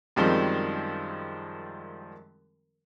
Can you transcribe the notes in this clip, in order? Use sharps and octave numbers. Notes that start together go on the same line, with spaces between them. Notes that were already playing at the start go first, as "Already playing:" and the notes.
F#2 D#3 F3 G3 G#3 C4